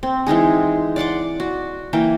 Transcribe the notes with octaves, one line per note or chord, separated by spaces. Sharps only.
C4
E3 G#3 D#4 G#4
D5 F#5 C6 D6
F#4
E3 A#3 G5